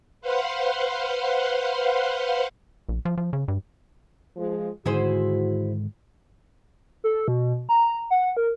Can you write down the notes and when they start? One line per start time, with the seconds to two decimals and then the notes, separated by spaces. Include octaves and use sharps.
0.21 B4 C5 F5 F#5 C6
2.89 A#1
3.05 F3
3.17 F3
3.33 C#3
3.48 G2
4.37 F3 G#3
4.86 G#2 D3 D#3 E4 F#4 G#4 C5
7.04 A4
7.28 B2
7.69 A#5
8.11 F#5
8.37 A#4